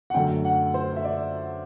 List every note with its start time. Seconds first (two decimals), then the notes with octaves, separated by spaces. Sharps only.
0.10 F#5
0.14 F#2 D3 F#3 A3 G5
0.45 F#5
0.74 C5
0.96 E5
1.04 D5